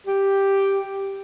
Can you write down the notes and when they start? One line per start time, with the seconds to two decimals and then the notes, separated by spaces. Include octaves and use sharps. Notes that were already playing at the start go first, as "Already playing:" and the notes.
0.07 G4